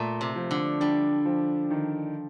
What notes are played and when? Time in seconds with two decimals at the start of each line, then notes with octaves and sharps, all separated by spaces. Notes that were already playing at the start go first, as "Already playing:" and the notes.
Already playing: A#2 A3
0.21 C3
0.36 F3
0.51 D3
0.80 G3 D4
1.25 F3
1.71 D#3